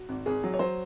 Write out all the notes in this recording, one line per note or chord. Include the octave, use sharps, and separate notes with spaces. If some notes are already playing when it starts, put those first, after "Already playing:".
Already playing: F#4
G#1
G#1 G#4
F#3
C#5
F#3 C5